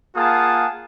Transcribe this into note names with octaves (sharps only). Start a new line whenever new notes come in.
A#3 F4 G#4 F#5 A5 D#6